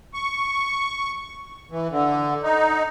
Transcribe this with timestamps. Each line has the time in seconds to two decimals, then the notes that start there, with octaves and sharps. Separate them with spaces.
0.14 C#6
1.71 E3
1.91 D3
2.43 D#4